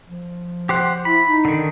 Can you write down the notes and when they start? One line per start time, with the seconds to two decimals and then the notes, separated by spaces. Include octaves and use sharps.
0.07 F3
0.69 G4 C5 F#5
1.05 E4 B5
1.26 D#4
1.45 D3 D#3